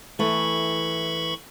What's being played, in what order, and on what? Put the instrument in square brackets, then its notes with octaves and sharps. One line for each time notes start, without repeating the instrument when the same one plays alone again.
[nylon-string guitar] E3 A3 [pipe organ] B5 C#6